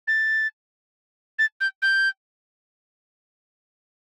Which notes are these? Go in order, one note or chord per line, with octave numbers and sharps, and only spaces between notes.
A6
A6
G6
G6